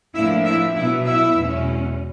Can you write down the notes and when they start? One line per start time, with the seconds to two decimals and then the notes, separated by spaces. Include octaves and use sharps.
0.14 A2 F3 A#3 D4 E4 E5
0.45 E4 E5
0.75 B2 F#3 B3 E4 E5
1.06 E4 E5
1.37 E2 B2 G#3 C#4